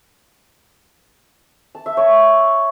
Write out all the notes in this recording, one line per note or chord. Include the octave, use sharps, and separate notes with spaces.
A5
E5
C#5